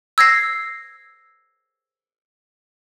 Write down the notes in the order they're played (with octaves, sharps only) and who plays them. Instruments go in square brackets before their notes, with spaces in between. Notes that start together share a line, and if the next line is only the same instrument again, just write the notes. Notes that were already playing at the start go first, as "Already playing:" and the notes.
[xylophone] E6 G#6 A#6 C7